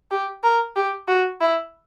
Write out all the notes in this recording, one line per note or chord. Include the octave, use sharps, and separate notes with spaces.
G4
A#4
G4
F#4
E4